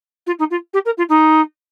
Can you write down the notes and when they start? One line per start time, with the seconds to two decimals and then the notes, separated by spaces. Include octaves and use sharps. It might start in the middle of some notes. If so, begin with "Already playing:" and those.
0.26 F4
0.39 D#4
0.50 F4
0.73 G4
0.85 A#4
0.97 F4
1.09 D#4